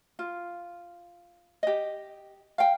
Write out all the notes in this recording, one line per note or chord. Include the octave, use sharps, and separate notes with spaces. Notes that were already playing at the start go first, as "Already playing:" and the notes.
F4
G4 D#5
F5 G5